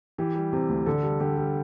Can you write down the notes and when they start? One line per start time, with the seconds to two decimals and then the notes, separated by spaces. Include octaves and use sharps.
0.18 E3 G4
0.35 G3
0.53 C3
0.69 D2
0.86 D3 A4
1.03 G3
1.20 D3 G4
1.38 G3